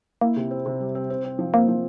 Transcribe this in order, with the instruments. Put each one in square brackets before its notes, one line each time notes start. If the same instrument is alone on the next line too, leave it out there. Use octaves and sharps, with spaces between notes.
[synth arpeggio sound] A#3 [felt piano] E4
[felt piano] C3
C4
C3
G3
C4
C4
C4
F3
[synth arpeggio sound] A#3 [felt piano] C4
[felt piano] F3